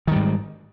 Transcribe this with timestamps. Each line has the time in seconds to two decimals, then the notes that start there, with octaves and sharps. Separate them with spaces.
0.07 D#3
0.12 G3
0.16 G#2